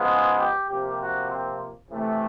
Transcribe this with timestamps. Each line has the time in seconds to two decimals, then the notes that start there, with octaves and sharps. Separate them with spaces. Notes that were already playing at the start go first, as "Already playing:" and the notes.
Already playing: C#3 F3 G#3 B3
0.09 G#4
0.39 G4
0.69 C3 F3 A#3 G4
0.99 F#4
1.30 C4
1.90 C3 E3 A3